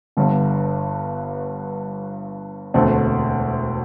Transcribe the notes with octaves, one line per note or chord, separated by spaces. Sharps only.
G1 G2 D3
E1 D2 D3 A3 C4